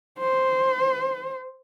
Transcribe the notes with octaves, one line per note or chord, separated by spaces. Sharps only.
C5